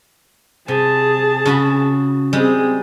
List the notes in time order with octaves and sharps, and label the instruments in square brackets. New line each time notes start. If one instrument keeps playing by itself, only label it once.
[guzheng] C3 [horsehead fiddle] G#4 A5
[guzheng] C#3 F#4 B5
[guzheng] G3 G#3 [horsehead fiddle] C4 G#4